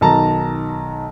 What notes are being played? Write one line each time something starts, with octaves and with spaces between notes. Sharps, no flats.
B1 D#3 A5 A#5